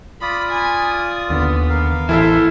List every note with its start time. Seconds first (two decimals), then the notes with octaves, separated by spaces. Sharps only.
0.22 F4 D5 B5 D#6
0.51 G#5
1.30 D#2 D3 B3
1.70 A#4 F5
2.09 A1 E3 E4 A4 C5 E5